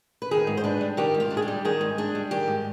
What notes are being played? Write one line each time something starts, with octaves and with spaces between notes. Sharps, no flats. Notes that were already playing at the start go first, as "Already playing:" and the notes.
B4
D#3 G#4
G#2
C5
D4 B4
G3
D#3 G4
G#2
F4
D4
G#4
G4
G3
D#3 G#4
G#2
D4 G#4
G3
D#3 G4
G#2